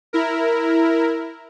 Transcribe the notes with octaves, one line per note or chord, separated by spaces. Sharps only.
E4 A#4